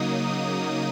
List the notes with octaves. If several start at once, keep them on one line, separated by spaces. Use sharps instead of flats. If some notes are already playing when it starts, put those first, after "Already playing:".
Already playing: C#3 F#3 A#3 D#4 D#6